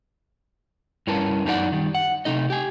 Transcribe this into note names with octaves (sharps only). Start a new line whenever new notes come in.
G2 C#4 E4 A#4 B4 A5
F#2 D#4 F#4 G4 D5 F#5
D#3 G3
F#5
C3 A3 D#4 D#5
G4 G#5